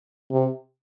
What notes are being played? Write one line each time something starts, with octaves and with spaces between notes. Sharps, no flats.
C3